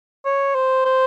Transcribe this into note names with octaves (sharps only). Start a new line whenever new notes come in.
C#5
C5
C5